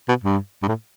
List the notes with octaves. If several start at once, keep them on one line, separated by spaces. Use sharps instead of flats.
B2
G2
G2
A2